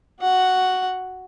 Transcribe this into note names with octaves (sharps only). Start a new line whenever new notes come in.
F#4 F#5